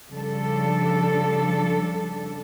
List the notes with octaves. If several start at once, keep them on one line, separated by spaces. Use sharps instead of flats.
C#3 F3 G3 D4 A4